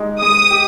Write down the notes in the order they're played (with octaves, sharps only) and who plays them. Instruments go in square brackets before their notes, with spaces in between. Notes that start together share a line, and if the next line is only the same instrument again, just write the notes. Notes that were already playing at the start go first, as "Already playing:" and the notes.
Already playing: [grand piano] G#3 D#4 G4
[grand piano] G#3 [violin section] D#6
[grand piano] G4